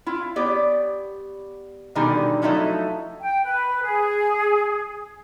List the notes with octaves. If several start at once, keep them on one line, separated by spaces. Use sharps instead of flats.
E4 F4
B3 G4 C#5 D5
B2 D3 D#3 G3 D#4 G#5
F3 F#3 A3 D#4 E4 A4
G5
B4
G#4